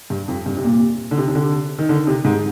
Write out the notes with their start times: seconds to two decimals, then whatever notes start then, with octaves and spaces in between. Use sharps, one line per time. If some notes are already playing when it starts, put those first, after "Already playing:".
0.10 G2
0.28 F2
0.46 G2
0.57 C3
0.64 A#2
1.11 D3
1.17 C3
1.28 C3
1.35 D3
1.79 D#3
1.89 D3
2.07 C3
2.25 G#2